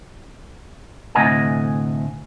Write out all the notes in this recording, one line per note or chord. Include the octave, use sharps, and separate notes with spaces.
D2 A2 C3 D#5 F#5 G#5